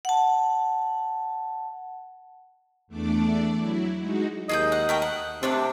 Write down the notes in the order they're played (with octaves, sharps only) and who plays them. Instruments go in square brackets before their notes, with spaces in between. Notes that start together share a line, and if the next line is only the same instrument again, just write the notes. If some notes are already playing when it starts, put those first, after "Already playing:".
[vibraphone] F#5 A5
[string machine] E2 A3 D4 D5
F#3 E4
G#3 D#4 F#4
[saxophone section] D#2 D#5 [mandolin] G#4 D#6 G6
[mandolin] F#5
A3 A#4 G5
F#5
[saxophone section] C3 [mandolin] A3 D4 D6